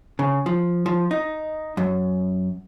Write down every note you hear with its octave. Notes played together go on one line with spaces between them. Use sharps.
C#3
F3
F3
D#4
F#2